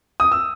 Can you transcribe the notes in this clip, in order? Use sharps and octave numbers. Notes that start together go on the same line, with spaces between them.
D#6
E6